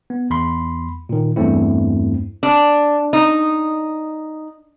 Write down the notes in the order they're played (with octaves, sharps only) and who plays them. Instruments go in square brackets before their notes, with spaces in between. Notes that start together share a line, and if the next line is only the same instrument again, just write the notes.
[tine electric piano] B3
E2 B5 C6
A#2 D#3
E2 G2 A3 C4 E4
[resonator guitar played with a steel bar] D4
D#4